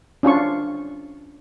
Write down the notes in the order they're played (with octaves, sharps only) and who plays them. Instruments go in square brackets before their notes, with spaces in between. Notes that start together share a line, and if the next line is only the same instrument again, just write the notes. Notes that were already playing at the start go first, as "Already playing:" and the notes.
[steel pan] C#4 D4 F4 C#6